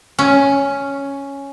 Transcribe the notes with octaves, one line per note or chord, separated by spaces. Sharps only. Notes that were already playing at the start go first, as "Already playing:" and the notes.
C#4